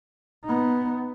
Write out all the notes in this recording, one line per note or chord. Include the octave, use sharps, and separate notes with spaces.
B3 D#4